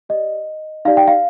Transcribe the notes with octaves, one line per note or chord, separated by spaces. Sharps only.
G4 D5 D#5
D#4 G4 D5 F5
G5
F5